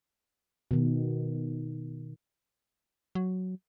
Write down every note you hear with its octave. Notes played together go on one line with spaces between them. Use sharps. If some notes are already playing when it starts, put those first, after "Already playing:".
B2 D#3
F#3